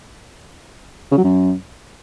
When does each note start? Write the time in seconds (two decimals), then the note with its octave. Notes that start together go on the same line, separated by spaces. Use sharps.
1.11 C#3
1.18 F#3
1.24 F#2